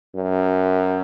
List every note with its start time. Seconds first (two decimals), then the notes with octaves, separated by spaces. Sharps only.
0.15 F#2